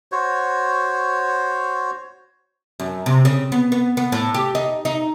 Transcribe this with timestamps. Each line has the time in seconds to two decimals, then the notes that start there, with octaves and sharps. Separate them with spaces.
0.12 F#4 C5 C#5
2.80 F#2
3.06 C3
3.25 C#3
3.52 B3
3.72 B3
3.97 B3
4.12 A2
4.34 G4
4.55 D#4
4.85 D#4